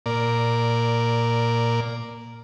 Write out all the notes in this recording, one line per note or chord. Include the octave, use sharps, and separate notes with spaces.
A#2 A#4 D5